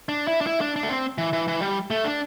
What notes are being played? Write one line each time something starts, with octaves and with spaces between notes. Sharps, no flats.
D4
E4
D4
E4
D4
D4
A3
C4
E3
E3
E3
G3
A3
D4